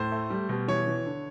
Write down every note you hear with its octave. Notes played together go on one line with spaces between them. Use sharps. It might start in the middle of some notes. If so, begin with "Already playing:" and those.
Already playing: A2 C5
A3
G3
B2
E3 C#5
E3
D3